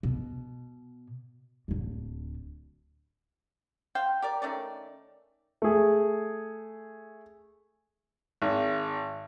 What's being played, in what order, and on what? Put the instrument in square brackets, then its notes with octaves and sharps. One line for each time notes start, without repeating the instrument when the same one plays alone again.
[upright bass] B2
D1 D3
[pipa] C5 F5 G5
G4 A#4 D5
D#3 A3 C#4 D5
[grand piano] A3 G#4
[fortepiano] G#1